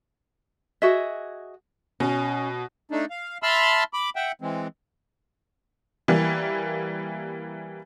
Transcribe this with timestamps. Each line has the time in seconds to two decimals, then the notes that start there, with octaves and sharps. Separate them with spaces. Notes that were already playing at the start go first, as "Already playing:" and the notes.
0.82 F#4 G#4 D#5 E5
2.00 B2 C#4
2.90 A3 D4 D#4
3.10 F5
3.43 E5 A5 B5 C6 E6 F6
3.93 B5 D6
4.16 E5 F#5 G5
4.41 E3 G#3 C4
6.08 E3 G3 A#3